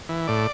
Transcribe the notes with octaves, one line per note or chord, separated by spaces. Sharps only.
E3
A2 D5